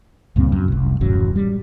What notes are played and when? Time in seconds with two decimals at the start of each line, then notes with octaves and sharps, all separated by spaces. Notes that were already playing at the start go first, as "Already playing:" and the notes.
0.36 C#2 G2 A#2 C4
0.52 F#2
0.68 F1 C2
1.00 D#1 A1 F#2 F#3
1.36 G3